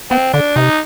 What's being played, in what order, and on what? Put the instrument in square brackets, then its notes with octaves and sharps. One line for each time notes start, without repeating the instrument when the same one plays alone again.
[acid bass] B3 [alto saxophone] C4
[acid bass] D3 [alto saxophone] D4
[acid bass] C3 [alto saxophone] D#4